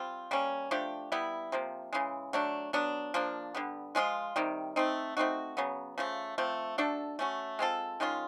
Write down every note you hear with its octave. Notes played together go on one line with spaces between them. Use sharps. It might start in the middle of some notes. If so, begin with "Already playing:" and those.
Already playing: G3 C4 F4
G3 A#3 C#4
F3 A3 D4 G4
G3 B3 E4
C3 F3 A#3
C#3 E3 G#3
F#3 A3 D4
F#3 B3 D4
F3 A#3 D4
D3 G3 B3
F3 G#3 C#4 F4
C3 D#3 G3
A3 C4 D#4
A3 C4 D#4 F#4
C#3 F#3 B3
C#3 F3 A3
F3 A3 C4
A3 D4 F#4 A4
A3 C#4 F#4
G#3 C4 F4 A4
D#3 G#3 C#4 F4